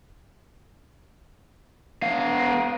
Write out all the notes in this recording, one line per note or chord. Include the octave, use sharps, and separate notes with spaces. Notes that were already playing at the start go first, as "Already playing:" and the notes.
B3 F5